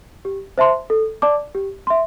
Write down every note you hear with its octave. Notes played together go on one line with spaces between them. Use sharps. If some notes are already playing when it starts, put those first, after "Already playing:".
G4
C5 E5 A5 C6
A4
D5 A5 D6
G4
E5 C6